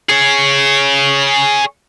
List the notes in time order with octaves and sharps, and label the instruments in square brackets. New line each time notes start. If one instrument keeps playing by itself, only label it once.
[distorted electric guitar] G#4 C#5